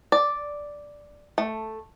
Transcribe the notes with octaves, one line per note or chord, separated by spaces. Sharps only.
D5
A3